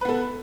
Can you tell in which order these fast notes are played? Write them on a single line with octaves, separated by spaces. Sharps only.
B4 B3 A4